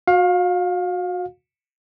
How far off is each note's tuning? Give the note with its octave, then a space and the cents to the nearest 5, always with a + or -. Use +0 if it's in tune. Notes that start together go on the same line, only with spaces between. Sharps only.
F#4 -30 F5 +25